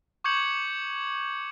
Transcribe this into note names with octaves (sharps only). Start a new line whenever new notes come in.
C#6 D6 G6 G#6 C#7 F#7